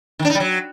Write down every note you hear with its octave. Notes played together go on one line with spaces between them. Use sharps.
D#3
D4
D#4
G3
F#3